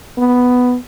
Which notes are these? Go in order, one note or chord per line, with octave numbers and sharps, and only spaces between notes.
B3